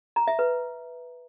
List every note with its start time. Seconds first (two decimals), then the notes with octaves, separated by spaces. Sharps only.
0.16 A#5
0.28 E5
0.39 B4